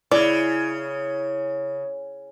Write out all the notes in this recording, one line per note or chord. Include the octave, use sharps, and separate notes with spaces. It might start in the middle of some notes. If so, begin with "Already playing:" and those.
C#3 E4 D5